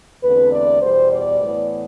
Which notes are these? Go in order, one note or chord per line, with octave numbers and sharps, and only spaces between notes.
E2 D3 A3 C4 B4
D5
E2 B2 G3 C5
D5
A2 E3 B3